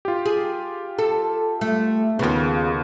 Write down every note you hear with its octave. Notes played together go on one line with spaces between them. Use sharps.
F4 G4
G#4
A4
A3
D#2 C#3 B3 F4